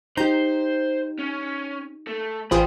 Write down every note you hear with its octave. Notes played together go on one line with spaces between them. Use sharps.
D#4 G4 C5 A#5 G6
C#4
A3
A1 F4 G#4 C5 G5 B5